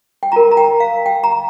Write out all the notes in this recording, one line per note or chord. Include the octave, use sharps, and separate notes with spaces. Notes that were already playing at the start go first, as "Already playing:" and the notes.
G5
F4 A#4 A#5
A#5
G5
F5
G5
A#5